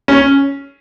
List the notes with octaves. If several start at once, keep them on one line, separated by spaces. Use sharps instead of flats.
C#4